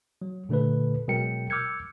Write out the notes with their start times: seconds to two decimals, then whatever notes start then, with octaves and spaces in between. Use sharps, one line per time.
0.22 F#3
0.49 A#2 D3 A3 A4 B4
1.08 B2 F#3 G#3 A#4 G5 C#7
1.50 D6 E6 F6 G6 G#6 C#7